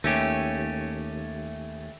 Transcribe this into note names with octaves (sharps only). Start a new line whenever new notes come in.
D#2 A3 C#4 G4